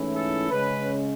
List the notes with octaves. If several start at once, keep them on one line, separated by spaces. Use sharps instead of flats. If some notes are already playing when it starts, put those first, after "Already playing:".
Already playing: G#2 E3 A3 C#4 E4
A4
C#3 G#3 C#4 B4